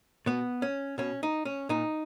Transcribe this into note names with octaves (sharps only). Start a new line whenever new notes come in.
B2 B3
C#4
B2 C#4
D#4
C#4
A#2 D#4